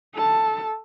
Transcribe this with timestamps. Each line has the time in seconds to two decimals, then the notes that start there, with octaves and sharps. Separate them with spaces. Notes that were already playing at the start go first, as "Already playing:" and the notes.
0.15 A4 A5